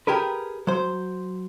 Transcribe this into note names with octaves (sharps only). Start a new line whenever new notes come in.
G4 G#4 A#4 B4
F#3 C5